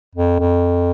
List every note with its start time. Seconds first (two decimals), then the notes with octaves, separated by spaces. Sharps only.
0.15 F2
0.39 F2